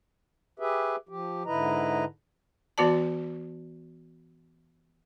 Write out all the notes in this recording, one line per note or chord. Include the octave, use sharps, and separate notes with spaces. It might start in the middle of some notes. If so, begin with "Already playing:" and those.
G4 G#4 B4 E5
F3 G4
G#2 D3 E4 B4 D#5 A#5
E3 B3 F#4 D5 A5